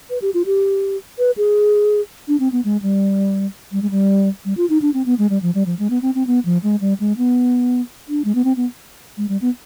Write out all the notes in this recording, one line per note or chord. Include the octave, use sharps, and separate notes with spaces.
B4
G4
F4
G4
B4
G#4
D4
C4
B3
G#3
G3
G3
G#3
G3
G3
F4
D#4
D4
C4
B3
G#3
G3
F3
G3
F3
G#3
B3
C4
C4
B3
F3
G#3
G3
G#3
B3
D4
G#3
B3
C4
B3
G#3
G3
B3